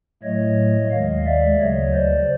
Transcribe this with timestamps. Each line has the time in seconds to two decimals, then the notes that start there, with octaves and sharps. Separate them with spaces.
0.23 A2 F#3 A3 C#5 D#5
0.91 D#2 D#3 G#3 D#5 F5
1.26 D5 E5
1.59 D2 C#3 F#3 C#5 D#5
1.93 C5 D5